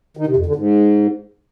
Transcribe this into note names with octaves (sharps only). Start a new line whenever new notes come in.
D#3
C3
F2
D3
G#2